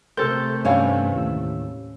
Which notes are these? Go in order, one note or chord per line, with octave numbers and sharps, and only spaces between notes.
C3 A3 A4 A#4 C5 G6 A6
G2 E3 G3 C#4 B4 C#5 F5 G#5
D#2 A2 E6